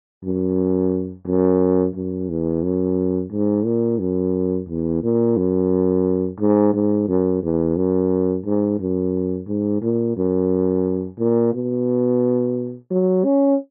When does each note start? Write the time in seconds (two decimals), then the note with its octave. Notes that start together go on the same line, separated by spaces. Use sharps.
0.24 F#2
1.26 F#2
1.95 F#2
2.29 E2
2.63 F#2
3.31 G#2
3.65 A#2
4.00 F#2
4.69 E2
5.03 A#2
5.37 F#2
6.40 G#2
6.74 G#2
7.08 F#2
7.43 E2
7.77 F#2
8.45 G#2
8.80 F#2
9.47 G#2
9.82 A#2
10.17 F#2
11.19 A#2
11.53 B2
12.90 F#3
13.24 C#4